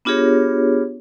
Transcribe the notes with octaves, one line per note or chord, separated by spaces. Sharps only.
B3 D4 F4 G4 G#4 C#5